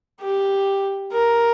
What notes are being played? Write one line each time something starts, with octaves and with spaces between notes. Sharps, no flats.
G4
A#4